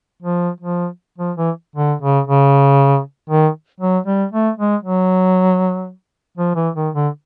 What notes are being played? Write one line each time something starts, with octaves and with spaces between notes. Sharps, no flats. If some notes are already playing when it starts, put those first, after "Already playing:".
F3
F3
F3
E3
D3
C#3
C#3
D#3
F#3
G3
A3
G#3
F#3
F3
E3
D#3
D3